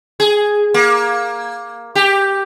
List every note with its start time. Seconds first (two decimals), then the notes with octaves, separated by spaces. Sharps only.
0.20 G#4
0.74 A#3
1.95 G4